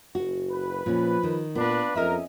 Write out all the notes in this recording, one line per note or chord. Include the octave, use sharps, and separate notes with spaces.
F#1 F#4
B4
A#2 F3 C#4
D#3
A#2 B3 D4 F4 B4
F2 C#4 A#4 D#5 E5